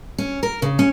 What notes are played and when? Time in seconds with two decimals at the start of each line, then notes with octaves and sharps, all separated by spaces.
0.18 C#4
0.43 A#4
0.62 C#3
0.79 C#4